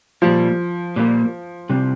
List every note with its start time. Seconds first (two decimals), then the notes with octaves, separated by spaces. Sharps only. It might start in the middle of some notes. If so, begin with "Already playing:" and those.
0.22 A#2 F3 G3 A#3
0.96 A#2 G3 A#3
1.70 C3 G3 C4